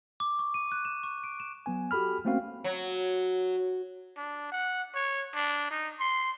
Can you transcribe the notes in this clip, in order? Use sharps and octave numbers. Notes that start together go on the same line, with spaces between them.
D6
C#6
D#7
F#6
E7
C#6
D7
E7
F#3 B3 G#5
F#4 G4 A4 B5 F6
A3 A#3 C4 C#4 F#4 F5
F#3
D4
F#5
C#5
D4
D#4
C6